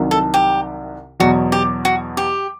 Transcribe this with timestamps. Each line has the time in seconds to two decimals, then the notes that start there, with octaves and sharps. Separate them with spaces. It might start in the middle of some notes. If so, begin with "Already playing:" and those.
Already playing: C2 C3 D#3 F#3
0.11 A4
0.34 G4
1.20 E2 B2 F#3 F#4
1.52 G4
1.85 F#4
2.17 G4